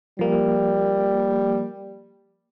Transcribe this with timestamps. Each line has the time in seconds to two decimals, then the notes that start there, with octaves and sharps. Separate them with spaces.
0.19 F3 G3 A#3